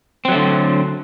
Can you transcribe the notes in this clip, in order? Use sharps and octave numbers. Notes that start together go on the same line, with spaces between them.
D3 F#3 A3 C4